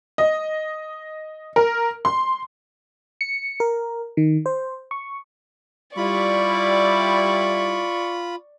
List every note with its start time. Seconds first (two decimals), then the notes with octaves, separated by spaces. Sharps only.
0.18 D#5
1.56 A#4
2.05 C6
3.21 C#7
3.60 A#4
4.17 D#3
4.46 C5
4.91 C#6
5.97 G3 E4 F4 D5 B5 C#6